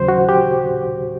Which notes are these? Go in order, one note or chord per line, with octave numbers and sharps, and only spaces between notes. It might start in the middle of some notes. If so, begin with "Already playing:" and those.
Already playing: D#2 C#3 F#3 C5
F#4
G4